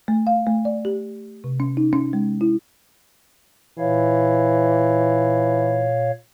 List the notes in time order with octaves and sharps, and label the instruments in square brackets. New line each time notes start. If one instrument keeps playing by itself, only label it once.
[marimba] A3
F5
A3
D5
G4
C3
C#4
D#4
C#4
G#3
E4
[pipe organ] A#2 C#5 F5 [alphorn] E3